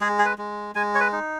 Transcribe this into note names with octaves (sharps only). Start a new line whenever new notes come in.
G#3 G#4
G#4
B4
G#3
G#3 G#5
C#5
B4
D#4